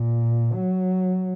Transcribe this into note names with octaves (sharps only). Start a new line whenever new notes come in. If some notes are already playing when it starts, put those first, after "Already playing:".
Already playing: A#2
F#3